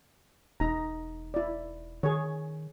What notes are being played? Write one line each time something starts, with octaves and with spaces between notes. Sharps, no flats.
E1 D#4 A#5
E4 D5
D#3 G#4 C#5